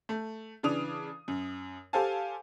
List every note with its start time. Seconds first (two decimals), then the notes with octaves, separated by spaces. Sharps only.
0.09 A3
0.63 C#3 E3 D4 D#6 F7
1.28 F#2
1.93 G4 A4 C5 F5 G#5 A5